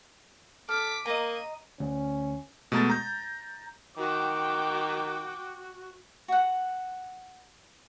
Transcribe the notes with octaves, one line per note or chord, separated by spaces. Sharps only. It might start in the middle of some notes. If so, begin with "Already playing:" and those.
A4 D6 F6 B6
A#3 D#5 A#5 D#7
D2 C#4
B2 G#3 A3 A#5 A6
A#5 G6
D#3 F#4 G5 D6
F#4 F#5